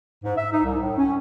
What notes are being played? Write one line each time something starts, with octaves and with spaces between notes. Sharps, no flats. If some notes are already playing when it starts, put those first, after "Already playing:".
G#2
E5
D#4
C2
A2
C#4